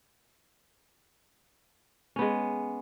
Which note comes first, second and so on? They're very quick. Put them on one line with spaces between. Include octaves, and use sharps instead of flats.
C#4 B3 G#3